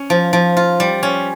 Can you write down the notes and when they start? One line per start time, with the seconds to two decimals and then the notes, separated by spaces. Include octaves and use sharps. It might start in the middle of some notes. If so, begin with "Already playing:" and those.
Already playing: C#4
0.10 F3
0.33 F3
0.57 F4
0.80 G3
1.03 C#4